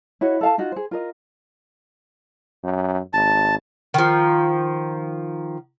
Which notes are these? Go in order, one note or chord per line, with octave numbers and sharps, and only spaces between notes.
E4 F#4 C#5 D#5
A4 F5 A5
D#4 F4 F#4
G#4 C5
F4 A#4 D#5
F#2
G#1 A5
D#3 F3